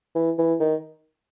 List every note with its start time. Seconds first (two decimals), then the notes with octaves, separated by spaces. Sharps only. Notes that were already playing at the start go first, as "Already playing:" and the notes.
0.15 E3
0.38 E3
0.60 D#3